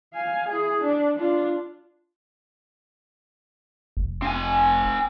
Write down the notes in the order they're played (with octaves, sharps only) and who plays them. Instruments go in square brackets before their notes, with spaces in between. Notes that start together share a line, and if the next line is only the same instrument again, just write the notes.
[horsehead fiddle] F5 G#5
E4 G#4
D4
D4 F4
[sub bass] F1
[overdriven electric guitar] C4 G#5